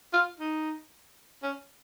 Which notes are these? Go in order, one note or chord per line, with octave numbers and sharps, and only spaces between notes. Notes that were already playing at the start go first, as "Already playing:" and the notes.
F4
D#4
C#4